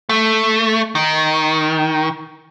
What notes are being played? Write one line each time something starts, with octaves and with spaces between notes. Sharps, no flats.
A3
D#3